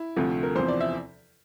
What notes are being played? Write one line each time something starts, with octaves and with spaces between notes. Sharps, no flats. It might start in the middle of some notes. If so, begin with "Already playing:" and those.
Already playing: E4
D2 C3 F3 A3
A#4
E2 C3 F3 C5
D5
E5